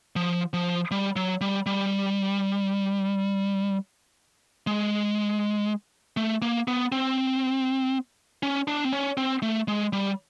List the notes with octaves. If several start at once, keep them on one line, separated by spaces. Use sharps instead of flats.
F3
F3
G3
F#3
G3
G3
G#3
A3
A#3
B3
C4
C#4
D4
C4
C#4
C4
A3
G#3
G3